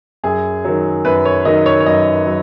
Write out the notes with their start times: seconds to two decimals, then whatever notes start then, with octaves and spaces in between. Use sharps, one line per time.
0.23 F#2 G#4
0.65 D#3 F#3
1.05 F#2 B4
1.25 C#5
1.45 D#3 F#3 D#5
1.66 C#5
1.80 C#5
1.86 F#2 D#5
2.27 F#3